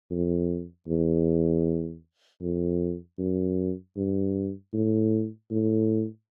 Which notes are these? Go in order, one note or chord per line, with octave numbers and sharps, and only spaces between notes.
F2
E2
F2
F#2
G2
A2
A2